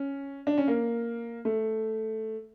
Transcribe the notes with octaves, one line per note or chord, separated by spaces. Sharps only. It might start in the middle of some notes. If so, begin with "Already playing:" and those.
Already playing: C#4
D4
C#4
A#3
A3